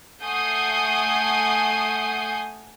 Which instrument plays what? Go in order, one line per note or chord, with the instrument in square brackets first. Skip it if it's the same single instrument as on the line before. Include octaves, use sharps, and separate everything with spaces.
[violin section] A3 F#5 G#5 D#6 G6 C7